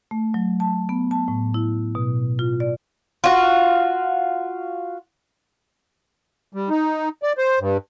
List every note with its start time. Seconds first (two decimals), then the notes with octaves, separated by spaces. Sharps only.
0.11 A3
0.34 F#3
0.60 A5
0.89 B3
1.11 A5
1.28 A2
1.54 E4
1.95 B2
2.39 F4
2.60 D5
3.24 F4 F#4
6.53 G3
6.70 D#4
7.23 D5
7.38 C5
7.60 G2